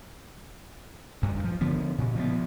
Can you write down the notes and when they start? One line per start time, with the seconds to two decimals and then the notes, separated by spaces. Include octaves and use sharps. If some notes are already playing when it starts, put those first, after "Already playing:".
1.22 D2 G2
1.44 F3
1.61 D3 F3 B3
1.98 A#2 C#3
2.15 F3 A#3 B3